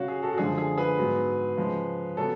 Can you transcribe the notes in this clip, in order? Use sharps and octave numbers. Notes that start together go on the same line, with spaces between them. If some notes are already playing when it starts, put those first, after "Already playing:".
Already playing: C#3 F#3 C#4 F#4 C#5 F5
G#4
F#4 A4
F#4
F#2 D3 F3 G#3 D4 G#4
G#4
G#4 B4
G#2 F#3 B3
C#3 F3 G#3
C#3 F#3 B3 A4 C#5